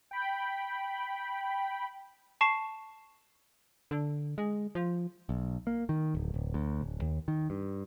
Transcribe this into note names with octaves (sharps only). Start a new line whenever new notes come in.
G5 B5
A5 C#6 C7 E7
D3
G#3
F3
B1
A#3
D#3
D1
D1
D2
D1
D#2
D#3
G2